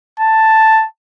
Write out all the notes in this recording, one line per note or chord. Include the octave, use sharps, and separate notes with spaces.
A5